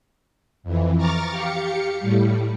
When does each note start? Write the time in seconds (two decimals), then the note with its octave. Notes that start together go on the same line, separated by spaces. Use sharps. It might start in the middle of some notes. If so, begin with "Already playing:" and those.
0.63 F2 E3
0.97 A#5 C#6 D6 F6 A6
1.31 G4 F5 C#7
2.00 A2 G3